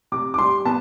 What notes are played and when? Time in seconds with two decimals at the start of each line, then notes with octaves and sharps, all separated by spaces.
0.12 C3 D6
0.34 D6
0.38 G3 C6
0.65 B3 A5